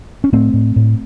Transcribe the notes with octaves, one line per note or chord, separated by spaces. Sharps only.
C#4
A2 A3 C4
A2
A2